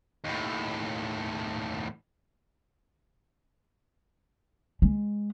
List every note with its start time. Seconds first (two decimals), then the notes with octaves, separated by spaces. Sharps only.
0.24 D#2 A2
4.82 G#3